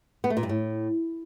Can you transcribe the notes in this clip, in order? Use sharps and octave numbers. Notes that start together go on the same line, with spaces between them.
B3
A3
A#2
G2
A2